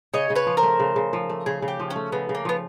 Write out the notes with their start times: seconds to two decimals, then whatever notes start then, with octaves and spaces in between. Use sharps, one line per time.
0.14 C#3 C#5 D#5
0.30 C#3
0.35 B4 C#5
0.47 F3
0.57 A#4 C5
0.63 A3
0.80 C#3
0.96 C#3
1.13 F3
1.29 A3
1.46 C#3 G#4
1.62 C#3
1.68 G4
1.79 F3
1.90 C#4
1.96 A3
2.12 C#3 B3
2.29 C#3
2.35 A#3
2.45 F3 B3